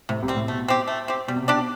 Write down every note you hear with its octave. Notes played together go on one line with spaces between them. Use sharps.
A2 C3
C2 C3
G3 C4
A2
B2 A3
C4 G4
A3
C4 G4
B2 G3
C3
B2
D4 G4 D5